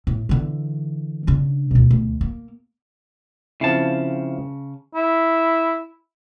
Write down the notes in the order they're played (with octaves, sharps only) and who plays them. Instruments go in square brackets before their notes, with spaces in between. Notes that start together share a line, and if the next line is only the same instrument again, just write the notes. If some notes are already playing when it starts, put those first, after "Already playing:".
[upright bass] A2
D3 E3
C#3 D4
D2 B2
D2
A#3
[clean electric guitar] C#3 A5 [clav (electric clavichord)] F3 C4 E4
[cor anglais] E4